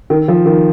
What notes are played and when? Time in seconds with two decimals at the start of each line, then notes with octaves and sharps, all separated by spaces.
0.10 D#3
0.28 F3
0.46 D#3